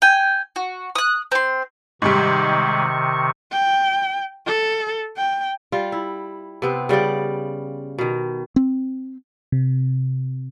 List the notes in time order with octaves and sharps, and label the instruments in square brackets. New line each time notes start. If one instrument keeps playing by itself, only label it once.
[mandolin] G5 G#5
F#4
D#6 F#6
C4 C6
[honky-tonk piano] G#2 G3 [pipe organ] C3 D#3 C#6
[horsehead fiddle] G5
A4
G5
[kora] G3 F4
E4
C3 B3 C4
C#3 G3 F4 D5
B2 D#3
[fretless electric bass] C4
[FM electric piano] C3